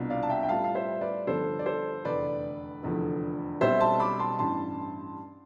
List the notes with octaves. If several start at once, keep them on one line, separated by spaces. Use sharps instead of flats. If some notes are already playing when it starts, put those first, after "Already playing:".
Already playing: C2 B2 B3 D4 F4
D5 F5
A5
E5 G5
G5
A2 G3 B3 F4 F5 A5
F5
C5 E5
B4 D5
G1 G2 F3 B3 A4 C5
D5
A4 C5
F1 E2 D3 B4 D5
F1 E2 D3 F3
B1 B2 G3 C4 C5 E5
A5 C6
B5 D6
A5 C6
A1 G2 E3 A5 C6